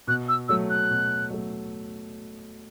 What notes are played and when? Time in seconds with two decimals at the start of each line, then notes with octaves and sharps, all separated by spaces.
0.07 B2 F#6
0.29 E6
0.48 F#3 A3 E6
0.70 F#6
0.90 B2
1.30 F#3 A3